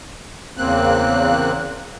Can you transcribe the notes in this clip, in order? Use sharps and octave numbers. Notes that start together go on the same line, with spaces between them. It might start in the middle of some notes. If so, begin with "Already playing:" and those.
E2 C#3 A#3 C4 F#6